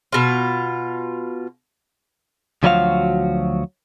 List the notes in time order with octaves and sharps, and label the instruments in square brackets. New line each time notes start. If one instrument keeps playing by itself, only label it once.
[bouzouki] B2 F4
[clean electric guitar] D2 F3 F#3 E4 F#4 F5